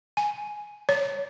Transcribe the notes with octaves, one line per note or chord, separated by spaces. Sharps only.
G#5
C#5